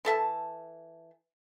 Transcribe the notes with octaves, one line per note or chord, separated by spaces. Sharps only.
E3 A4 E5 A5